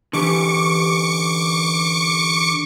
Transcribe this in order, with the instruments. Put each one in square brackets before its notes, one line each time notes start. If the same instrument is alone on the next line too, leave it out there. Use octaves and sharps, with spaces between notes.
[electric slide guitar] D3 E3 G4 [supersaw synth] C#6 D6 C#7